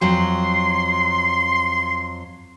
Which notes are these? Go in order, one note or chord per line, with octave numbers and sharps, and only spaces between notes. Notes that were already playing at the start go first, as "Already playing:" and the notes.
F2 F#3 G5 C6